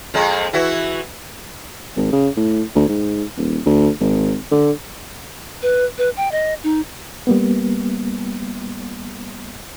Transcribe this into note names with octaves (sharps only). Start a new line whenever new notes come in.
F2 G#3
E3 E4 F#4
G#1
C#3
A2
D2
G#2
D#1
D2
G#1
D3
B4
B4
G5
D#5
D#4
G3 A#3 B3